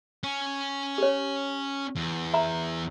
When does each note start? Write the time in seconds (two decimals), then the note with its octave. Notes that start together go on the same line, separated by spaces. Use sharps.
0.23 C#4
0.98 G4 C#5
1.96 E2
2.34 E5 A#5